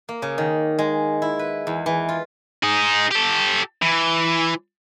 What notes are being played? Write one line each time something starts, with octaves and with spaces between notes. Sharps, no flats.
A#3
C#3
D#3
G#3
E4
B4
E2
E3
F4
D#4 G#4
G4 A4
E3